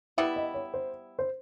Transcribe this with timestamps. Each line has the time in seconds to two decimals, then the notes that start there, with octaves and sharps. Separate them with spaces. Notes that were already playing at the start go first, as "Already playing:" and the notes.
0.18 G3 B3 E4 E5
0.36 D#5
0.54 C#5
0.74 C5
1.19 C5